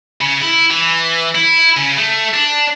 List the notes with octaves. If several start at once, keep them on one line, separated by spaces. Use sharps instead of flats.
C#3
E4
E3
E4
C#3
A3
D4